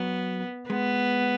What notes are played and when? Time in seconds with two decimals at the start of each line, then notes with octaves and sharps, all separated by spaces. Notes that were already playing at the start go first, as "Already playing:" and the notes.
Already playing: F#3 B3
0.70 G#3 B3